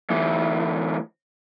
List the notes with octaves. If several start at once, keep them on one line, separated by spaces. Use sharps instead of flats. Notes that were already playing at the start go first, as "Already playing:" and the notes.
D2 E3